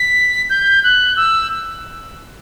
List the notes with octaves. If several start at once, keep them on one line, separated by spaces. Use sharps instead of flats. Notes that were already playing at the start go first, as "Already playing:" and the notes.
Already playing: B6
G6
F#6
E6